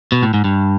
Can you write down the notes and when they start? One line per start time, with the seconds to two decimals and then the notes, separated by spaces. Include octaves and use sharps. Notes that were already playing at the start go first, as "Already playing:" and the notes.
0.12 B2
0.23 A2
0.34 G#2
0.44 G2